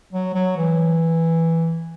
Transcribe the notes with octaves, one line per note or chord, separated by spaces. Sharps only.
F#3
F#3
E3